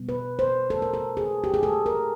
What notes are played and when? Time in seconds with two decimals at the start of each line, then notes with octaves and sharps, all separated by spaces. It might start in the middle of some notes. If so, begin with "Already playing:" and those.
Already playing: B2 G3 B3
0.09 B4
0.39 C5
0.70 A4
0.82 A#4
0.94 A4
1.17 G#4
1.44 G4
1.54 G#4
1.63 A4
1.86 A#4